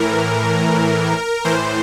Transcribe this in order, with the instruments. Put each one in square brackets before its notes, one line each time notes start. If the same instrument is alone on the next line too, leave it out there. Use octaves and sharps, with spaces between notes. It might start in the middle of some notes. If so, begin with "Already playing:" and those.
Already playing: [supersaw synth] A2 E3 A#4
A2 E3 C5